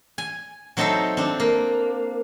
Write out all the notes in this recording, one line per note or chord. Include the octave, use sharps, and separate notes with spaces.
G#5
F#3 C4 D#4 A4 C5 E5
C4 D4
A#3